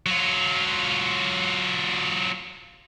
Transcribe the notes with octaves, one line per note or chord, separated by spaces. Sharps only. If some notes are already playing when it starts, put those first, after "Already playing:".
F#3 F4